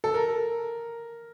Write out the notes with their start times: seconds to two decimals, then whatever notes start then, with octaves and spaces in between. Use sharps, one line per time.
0.04 A4
0.14 A#4